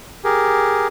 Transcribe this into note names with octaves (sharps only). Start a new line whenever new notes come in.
G4 G#4 A#4